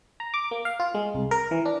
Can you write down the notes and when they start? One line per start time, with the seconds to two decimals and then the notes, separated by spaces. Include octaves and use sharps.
0.20 A#5
0.34 D6
0.51 A#3
0.65 F5
0.80 F4
0.95 G#3
1.14 C2
1.31 A#4
1.51 E3
1.65 D4